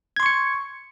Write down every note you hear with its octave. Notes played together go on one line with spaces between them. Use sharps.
C6 C#6 G#6 C#7